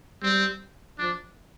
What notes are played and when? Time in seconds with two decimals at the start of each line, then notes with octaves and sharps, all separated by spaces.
0.22 G3 C4
0.99 F3 D4